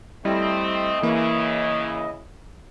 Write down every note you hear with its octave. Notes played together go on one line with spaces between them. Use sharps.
G3 A3 C4 E4 D#5
C#3 E3 A#3 E4